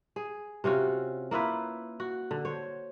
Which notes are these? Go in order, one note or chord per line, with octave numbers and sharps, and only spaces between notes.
G#4
C3 C#4 F4 F#4
A#3 E4 F4 B4
F#4
D3
C5 C#5